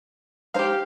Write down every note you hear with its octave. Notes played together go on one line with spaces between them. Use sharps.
G#3 D#4 G4 C5 F5